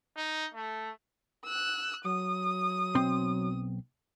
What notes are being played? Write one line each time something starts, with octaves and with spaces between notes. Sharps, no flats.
D#4
A3
E6 F#6
F#3 D#6
B1 C4 C6